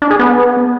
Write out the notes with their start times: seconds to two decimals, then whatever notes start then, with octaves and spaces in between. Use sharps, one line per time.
0.02 D4
0.11 G#4
0.19 B3